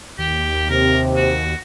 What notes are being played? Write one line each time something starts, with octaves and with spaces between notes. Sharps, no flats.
D#2 G4
C3 A#4
F#4